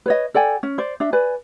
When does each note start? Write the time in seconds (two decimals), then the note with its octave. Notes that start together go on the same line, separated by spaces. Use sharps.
0.06 B4 C#5 D#5
0.34 A4 D5 G5 G#5
0.63 C#4
0.78 C5 D5
1.00 D4 E5
1.13 B4 D5 G#5